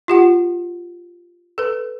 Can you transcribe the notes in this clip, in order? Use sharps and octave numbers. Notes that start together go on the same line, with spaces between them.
F4 G4 F#5
A4 B4